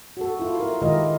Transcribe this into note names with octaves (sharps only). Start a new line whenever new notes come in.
F#4 A4
E4 F4
E4 A#4
D#3 G#3 F4 G4 A#4 D#5